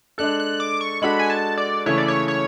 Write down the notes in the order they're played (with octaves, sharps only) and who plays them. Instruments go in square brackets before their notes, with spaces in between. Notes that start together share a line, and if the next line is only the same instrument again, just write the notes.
[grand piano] G#3 D4 A4 [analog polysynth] F#6
[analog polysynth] F#6
D6
C#6
[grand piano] G#3 D4 F#4 A4 [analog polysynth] B5
[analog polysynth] G#5
A5
D5
[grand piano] C#3 E3 A3 E4 [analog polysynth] C#5
[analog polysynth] D5
C#5
C#5